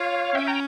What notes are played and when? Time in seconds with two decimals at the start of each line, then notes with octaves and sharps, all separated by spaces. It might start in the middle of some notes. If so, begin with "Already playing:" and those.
Already playing: F4 C#5 F5
0.35 C#4 E5 G5
0.47 G5 A#5